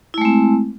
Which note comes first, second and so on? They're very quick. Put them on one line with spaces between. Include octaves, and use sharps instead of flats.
E4 A3 G#3 C4